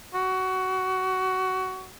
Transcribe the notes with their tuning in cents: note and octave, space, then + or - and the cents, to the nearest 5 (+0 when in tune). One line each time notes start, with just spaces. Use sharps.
F#4 +20